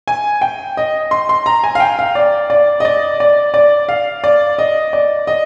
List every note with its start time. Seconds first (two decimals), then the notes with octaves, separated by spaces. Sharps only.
0.08 G#5
0.41 G5
0.77 D#5
1.11 C6
1.29 C6
1.46 A#5
1.64 G#5
1.75 F5
1.80 G5
1.99 F5
2.15 D5
2.50 D5
2.80 D#5
2.85 D5
3.20 D5
3.54 D5
3.89 F5
4.24 D5
4.58 D#5
4.93 D5
5.27 D#5